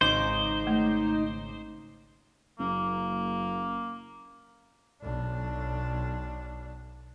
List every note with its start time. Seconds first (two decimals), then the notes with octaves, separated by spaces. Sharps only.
0.01 G#1 C#3 D#4 C5 D6
0.67 A3
2.59 F#1 A#3
5.02 B1 D4